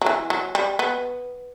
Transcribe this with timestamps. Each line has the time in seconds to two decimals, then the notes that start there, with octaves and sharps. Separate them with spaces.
0.02 F#3
0.06 E3
0.30 F#3
0.55 G3
0.79 B3